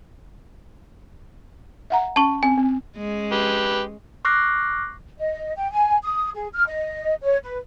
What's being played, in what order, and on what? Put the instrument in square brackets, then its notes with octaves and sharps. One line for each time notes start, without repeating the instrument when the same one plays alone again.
[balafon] E5 F#5 A#5
[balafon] C#4 [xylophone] A5 C#6
[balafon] C4 [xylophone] G#5
[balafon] C4
[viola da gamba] G#3 C#4
[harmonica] G4 B4
[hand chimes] C#6 D6 F6 F#6 A#6 C7
[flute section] D#5
G5
G#5
D#6
G#4
F6
D#5
C#5
B4